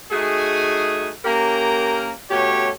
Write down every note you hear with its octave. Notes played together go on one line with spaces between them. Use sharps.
A3 D#4 F#4 G#4
A#3 C#4 G4 A#4 A#5
B2 A3 C#4 G4 C#5